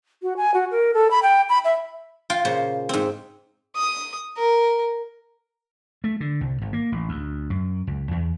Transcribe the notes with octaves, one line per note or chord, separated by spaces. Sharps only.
F#4
G#5
F#4
A#4
A4
B5
G5
B5
E5
F4 G5
A#2 C#3 C5
G#2 C4
D#6
A#4
A3
D3
C2
G#1
A#3
A1
D2
F#2
C#2
E2